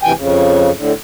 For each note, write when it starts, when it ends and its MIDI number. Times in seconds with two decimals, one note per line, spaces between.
0.03 0.12 38
0.03 0.12 48
0.03 0.12 52
0.03 0.12 79
0.03 0.12 80
0.16 0.71 41
0.16 0.71 49
0.77 0.93 45
0.77 0.93 50